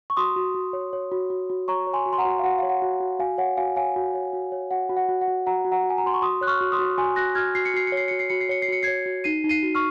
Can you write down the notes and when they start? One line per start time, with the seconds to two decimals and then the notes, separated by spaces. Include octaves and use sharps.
0.10 C#6
0.17 F#4 C6 D#6
0.36 F#4
0.55 F#4
0.73 C#5
0.93 C#5
1.12 F#4
1.30 F#4
1.50 F#4
1.68 C#5 A#5 C#6
1.87 C#5
1.93 G#5 C6
2.06 F#4
2.13 C6
2.18 F#5 A#5
2.25 F#4
2.39 F5
2.43 F#4 F#5
2.59 C#5 F5
2.69 F#5
2.82 F#4
3.00 F#4
3.19 F#4 F5 G#5
3.38 C#5 F#5
3.57 F#4 F5 G#5
3.76 C#5 F5 G#5
3.96 F#4
4.15 C#5
4.33 F#4
4.52 C#5
4.71 F#4 F#5
4.90 F#4
4.97 F#5
5.09 F#4
5.21 F#5
5.28 F#4
5.46 F#4 F#5 A#5
5.65 F#4
5.72 F#5 A#5
5.84 F#4
5.90 G#5
5.98 A#5
6.04 F#4 C6
6.14 C#6
6.22 F#4 C6 D#6
6.41 C#5 F#6
6.47 C#6 F6
6.61 F#4
6.72 C6 D#6
6.79 F#4
6.98 F#4 G#5 C6
7.16 F#4 F#6 A#6
7.35 F#4 F6 G#6
7.55 F#4 C7
7.65 C#7
7.74 F#4 C7
7.87 C#5 C#7
7.97 C7
8.08 F#4 C#7
8.19 C7
8.30 F#4 C#7
8.41 C7
8.49 C#5 C#7
8.62 C7
8.68 F#4 C#7
8.83 C#5 G#6 C7
9.06 F#4
9.24 D#4 C7 D#7
9.44 D#4
9.49 C7 D#7
9.63 F#4
9.75 C#6 F6